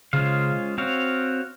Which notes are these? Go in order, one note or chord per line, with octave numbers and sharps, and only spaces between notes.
C#3 G#3 C#4 F4 C5 F5
C4 F#4 C#5 F5